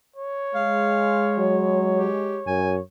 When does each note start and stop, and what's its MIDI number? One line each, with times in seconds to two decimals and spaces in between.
0.16 2.82 73
0.55 2.42 56
0.55 1.52 77
1.38 2.06 54
1.96 2.39 67
2.47 2.77 42
2.47 2.73 80